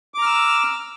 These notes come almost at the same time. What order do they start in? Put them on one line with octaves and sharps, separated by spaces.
D6 A#5 F6 E6